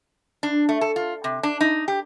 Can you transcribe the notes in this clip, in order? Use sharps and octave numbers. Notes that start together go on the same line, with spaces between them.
D4
A3
A4
F4
C3
D4
D#4
G4